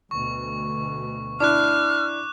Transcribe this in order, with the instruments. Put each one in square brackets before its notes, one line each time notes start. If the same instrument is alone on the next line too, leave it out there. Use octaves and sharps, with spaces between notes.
[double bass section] D2 B2 [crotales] C#6
[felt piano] D4 E4 [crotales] D6 F#6 [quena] F6